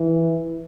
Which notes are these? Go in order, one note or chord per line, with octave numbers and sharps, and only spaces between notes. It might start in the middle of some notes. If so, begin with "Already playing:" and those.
Already playing: E3